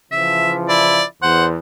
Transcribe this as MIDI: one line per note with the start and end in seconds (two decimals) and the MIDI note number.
0.12 1.02 49
0.12 1.02 52
0.12 1.02 53
0.12 0.52 76
0.69 1.06 64
0.69 1.04 74
1.22 1.56 40
1.22 1.48 72
1.22 1.45 78